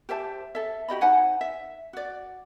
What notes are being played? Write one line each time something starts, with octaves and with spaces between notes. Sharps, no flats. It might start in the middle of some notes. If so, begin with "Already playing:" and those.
G4 C5 E5 A5
A4 E5
F#4 G4 D#5 B5
D#4 C5 F#5 G#5
E5
F#4 D5